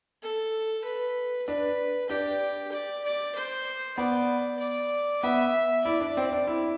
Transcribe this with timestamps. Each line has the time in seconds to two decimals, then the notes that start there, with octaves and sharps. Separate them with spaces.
0.22 A4
0.84 B4
1.47 D4 B4
2.09 D4 G4
2.72 D5
3.04 D5
3.35 C5
3.98 B3 D5
4.60 D5
5.23 B3 E5
5.85 E4 D5
6.00 D4
6.17 C4
6.33 D4
6.47 E4